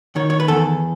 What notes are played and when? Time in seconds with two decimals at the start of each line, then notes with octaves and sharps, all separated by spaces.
0.16 D#3 C#5
0.30 C#5
0.40 B4
0.48 E2 A4